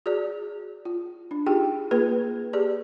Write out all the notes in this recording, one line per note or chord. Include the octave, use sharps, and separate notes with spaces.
F#4 G#4 D5
F4
D4
D#4 F4 G4 G#4 G5
A#3 F4 G#4 B4
G4 G#4 D5